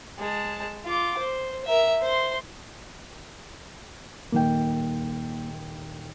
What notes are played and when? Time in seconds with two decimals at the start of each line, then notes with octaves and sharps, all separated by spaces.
0.19 G#3 A5
0.85 F4 D6
1.18 C5
1.64 A#4 E5
2.02 C5 C6
4.32 D#1 D#3 A#3 G5